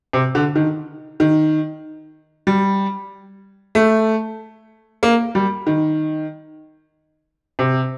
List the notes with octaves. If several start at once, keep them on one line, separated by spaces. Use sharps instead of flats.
C3
D3
D#3
D#3
G3
A3
A#3
G3
D#3
C3